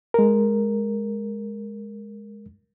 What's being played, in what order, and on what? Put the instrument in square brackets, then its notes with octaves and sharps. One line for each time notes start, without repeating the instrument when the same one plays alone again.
[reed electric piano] G#3 A#4